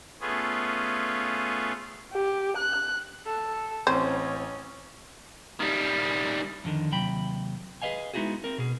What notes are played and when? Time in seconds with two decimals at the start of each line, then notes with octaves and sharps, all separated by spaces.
0.21 A3 B3 C#4 F4 G#4
2.13 G4
2.57 F#6
3.26 A4
3.87 A1 C4 C#4 C5 G#6
5.60 D#3 G3
6.64 F2 A2 D3 D#3
6.91 D#2 C3 F#3 G5 B5
7.82 G#4 B4 C#5 D#5 F5 G#5
8.14 G#3 B3 D#4 E4 F#4 G#4
8.44 C4 A#4
8.58 B2 G#4